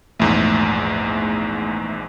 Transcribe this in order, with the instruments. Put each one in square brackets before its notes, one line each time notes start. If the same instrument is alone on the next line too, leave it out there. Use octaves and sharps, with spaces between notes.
[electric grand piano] A#1 E2 G#2 [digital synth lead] A3